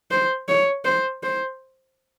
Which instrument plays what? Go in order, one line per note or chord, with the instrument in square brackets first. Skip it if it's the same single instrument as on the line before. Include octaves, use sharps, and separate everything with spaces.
[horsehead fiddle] C5
C#5
C5
C5